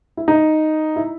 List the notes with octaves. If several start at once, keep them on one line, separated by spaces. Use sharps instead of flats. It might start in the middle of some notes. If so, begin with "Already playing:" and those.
E4
D#4
E4